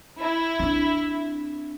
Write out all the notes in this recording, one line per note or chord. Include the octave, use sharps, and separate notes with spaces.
E4
C4 D4